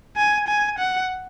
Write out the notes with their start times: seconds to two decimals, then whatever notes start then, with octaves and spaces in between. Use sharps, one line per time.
0.17 G#5
0.48 G#5
0.78 F#5